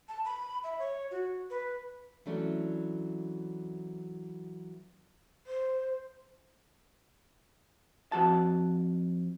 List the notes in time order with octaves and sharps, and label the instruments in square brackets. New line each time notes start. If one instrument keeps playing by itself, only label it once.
[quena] A5
B5
E5
C#5
F#4
B4
[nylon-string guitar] E3 F#3 A3 C#4 D4
[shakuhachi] C5
[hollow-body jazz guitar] F2 E3 F#4 A5